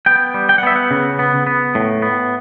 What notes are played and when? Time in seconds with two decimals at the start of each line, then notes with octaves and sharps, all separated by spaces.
0.06 B3 G5
0.34 G3
0.49 G5
0.58 F#5
0.63 B3 E5
0.76 F#5
0.91 C#3
1.19 B3
1.47 B3
1.75 A2
2.02 B3